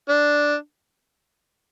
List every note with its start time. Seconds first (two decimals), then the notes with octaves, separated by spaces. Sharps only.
0.09 D4